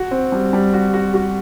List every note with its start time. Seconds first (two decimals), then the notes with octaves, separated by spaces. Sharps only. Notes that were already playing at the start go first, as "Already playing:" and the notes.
Already playing: F#4
0.11 C4
0.32 G3
0.53 G3
0.74 F#4
0.94 F#4
1.14 F#4